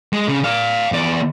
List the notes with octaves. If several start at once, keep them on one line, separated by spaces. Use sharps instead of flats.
G#3
C#3
D5 F5
E2 D5